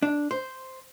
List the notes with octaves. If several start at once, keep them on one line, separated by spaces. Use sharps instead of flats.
D4
C5